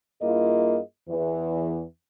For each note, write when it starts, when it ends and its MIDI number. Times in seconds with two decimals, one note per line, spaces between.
0.22 0.79 43
0.22 0.79 58
0.22 0.79 64
0.22 0.79 65
0.22 0.79 68
0.22 0.79 75
1.09 1.83 40
1.09 1.83 52